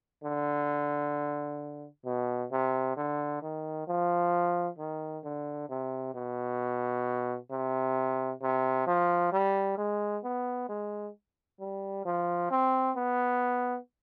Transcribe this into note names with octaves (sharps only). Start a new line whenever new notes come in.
D3
B2
C3
D3
D#3
F3
D#3
D3
C3
B2
C3
C3
F3
G3
G#3
B3
G#3
G3
F3
C4
B3